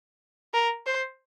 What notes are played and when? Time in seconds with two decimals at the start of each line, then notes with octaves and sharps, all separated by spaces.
0.54 A#4
0.87 C5